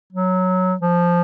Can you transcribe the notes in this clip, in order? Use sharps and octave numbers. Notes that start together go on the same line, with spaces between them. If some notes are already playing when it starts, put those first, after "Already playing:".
F#3
F3